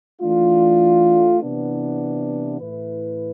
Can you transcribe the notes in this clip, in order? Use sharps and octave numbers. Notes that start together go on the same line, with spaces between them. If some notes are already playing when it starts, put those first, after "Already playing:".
E3 A3 D4 F4
C3 E3 B3 D4
A2 E3 A3 E4 B4